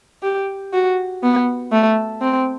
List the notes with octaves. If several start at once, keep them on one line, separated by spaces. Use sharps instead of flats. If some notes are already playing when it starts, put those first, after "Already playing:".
G4
F#4
B3
A3
C4